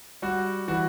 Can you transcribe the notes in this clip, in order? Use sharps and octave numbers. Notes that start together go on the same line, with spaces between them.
G3 F#4
E3 F#4